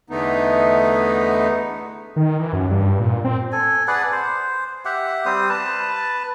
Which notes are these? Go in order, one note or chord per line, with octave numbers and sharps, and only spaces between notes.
E2 D3 A3 B3 D#4
D#3
E3
F#2
G2
A#2
C4
A4 G#5
G#4 B4 D5 F#5
C5
G4 E5 F#5
G3 C4 C5 D#6
B4 A5